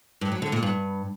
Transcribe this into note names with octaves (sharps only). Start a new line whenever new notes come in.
G2
F#3
D3
A#2
G2